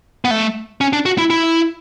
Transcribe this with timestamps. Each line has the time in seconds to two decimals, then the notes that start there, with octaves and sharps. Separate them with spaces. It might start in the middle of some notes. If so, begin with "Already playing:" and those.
0.25 B3
0.31 A3
0.81 C#4
0.93 D4
1.06 F#4
1.18 E4
1.30 E4